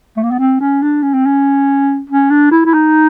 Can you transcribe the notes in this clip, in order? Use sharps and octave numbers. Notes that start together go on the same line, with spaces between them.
A3
A#3
B3
C4
C#4
D4
C#4
C4
C#4
C#4
D4
E4
E4
D#4